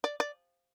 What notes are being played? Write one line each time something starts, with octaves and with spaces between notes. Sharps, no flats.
D5
D5